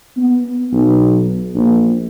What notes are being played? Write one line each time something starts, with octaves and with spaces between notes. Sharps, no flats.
B3
B1
A#1